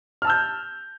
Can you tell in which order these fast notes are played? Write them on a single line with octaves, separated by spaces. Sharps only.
F6 A5 E6 G6